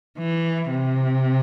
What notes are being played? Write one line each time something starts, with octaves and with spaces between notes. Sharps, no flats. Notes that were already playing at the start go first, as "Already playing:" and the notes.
E3
C3